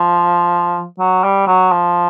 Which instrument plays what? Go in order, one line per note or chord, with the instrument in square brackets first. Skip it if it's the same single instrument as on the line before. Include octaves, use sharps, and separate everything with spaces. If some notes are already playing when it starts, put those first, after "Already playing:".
Already playing: [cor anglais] F3
F#3
G3
F#3
F3